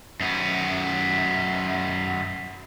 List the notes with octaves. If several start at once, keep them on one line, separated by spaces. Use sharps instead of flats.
F#2 B3